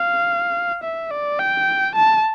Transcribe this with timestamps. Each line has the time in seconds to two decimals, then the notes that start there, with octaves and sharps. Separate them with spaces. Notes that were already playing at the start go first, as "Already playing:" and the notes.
Already playing: F5
0.83 E5
1.11 D5
1.39 G5
1.95 A5